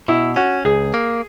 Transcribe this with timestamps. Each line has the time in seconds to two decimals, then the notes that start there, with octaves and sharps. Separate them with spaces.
0.08 B2 E4
0.36 C#4 F#4
0.65 C#2 G#4
0.94 A#3